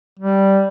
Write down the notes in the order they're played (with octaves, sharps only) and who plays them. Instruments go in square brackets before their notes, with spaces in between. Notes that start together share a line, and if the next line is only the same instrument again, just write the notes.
[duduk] G3